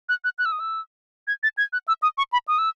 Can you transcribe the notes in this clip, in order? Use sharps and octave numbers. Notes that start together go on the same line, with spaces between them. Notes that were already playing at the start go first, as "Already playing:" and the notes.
F#6
F#6
F#6
E6
D#6
E6
G#6
A6
G#6
F#6
E6
D#6
C#6
B5
D#6
E6